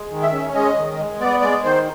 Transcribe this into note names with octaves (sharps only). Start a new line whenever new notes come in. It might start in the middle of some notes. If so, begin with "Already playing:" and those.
Already playing: G#3
D#3
E5
C#4
G#3 D#5
D#3
G#3
B3 D5
G#3 D5
D#3 C5